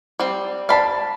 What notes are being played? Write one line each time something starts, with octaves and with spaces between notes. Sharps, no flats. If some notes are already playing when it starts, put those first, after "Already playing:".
G3 C4
D5 F5 A5 B5